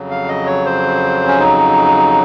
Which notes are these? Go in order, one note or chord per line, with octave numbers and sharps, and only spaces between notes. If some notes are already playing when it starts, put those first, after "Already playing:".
Already playing: F2 C#3 F#3
F5
D#5
C#5
C5
C#4
D#4